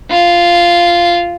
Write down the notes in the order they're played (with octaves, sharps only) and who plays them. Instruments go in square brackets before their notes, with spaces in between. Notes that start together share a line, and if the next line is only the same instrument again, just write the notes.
[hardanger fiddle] F4